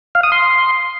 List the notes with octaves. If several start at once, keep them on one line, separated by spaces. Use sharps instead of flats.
F5
D#6
C6